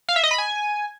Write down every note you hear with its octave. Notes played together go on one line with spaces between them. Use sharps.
F5
E5
D#5
B5
G#5